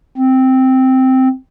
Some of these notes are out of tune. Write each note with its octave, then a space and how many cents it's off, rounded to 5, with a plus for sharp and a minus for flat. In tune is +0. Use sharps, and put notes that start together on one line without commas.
C4 -5